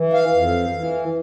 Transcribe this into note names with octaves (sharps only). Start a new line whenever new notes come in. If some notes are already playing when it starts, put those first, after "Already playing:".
Already playing: E3
F5
F2
E3